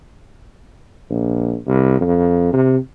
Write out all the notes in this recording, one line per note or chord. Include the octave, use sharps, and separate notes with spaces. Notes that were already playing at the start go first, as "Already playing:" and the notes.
A#1
C2
F2
C3